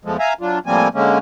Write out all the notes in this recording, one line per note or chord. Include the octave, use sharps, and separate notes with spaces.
E2 F3 G#3 A3
E5 F5 G#5 A#5
F#3 D4 F4
A2 F3 G3 A#3 C4 G#5
D3 G#3 A#3 C#4